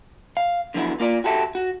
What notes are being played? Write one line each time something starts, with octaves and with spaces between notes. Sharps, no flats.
F5
D3 F3 F#3 B3 E4
A#3 F4 D5
F#4 G4 A4 E5
F#4